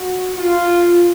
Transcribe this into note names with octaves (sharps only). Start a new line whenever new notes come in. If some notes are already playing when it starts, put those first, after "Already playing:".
Already playing: F#4
F4